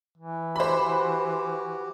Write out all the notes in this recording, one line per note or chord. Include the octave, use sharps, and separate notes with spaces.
E3
F#4 G4 C5 B5